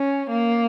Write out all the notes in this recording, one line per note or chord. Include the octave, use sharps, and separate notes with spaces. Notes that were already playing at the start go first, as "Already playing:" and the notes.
Already playing: C#4
A#3